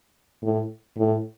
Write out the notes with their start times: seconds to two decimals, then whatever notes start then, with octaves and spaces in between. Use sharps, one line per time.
0.43 A2
0.97 A2